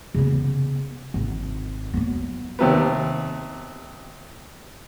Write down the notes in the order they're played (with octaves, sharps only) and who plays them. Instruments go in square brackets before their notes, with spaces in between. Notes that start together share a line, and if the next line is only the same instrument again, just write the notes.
[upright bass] C#3 B3
G#1
F#3 B3
[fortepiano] D#2 C3 B3